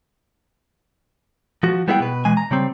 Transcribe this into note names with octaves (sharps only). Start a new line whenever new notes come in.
F3 F#4
G3 B3 E4 G#4 E5 G5
B2 B4
B2 E3 G#3 G#5
A#5
C#3 G3 C4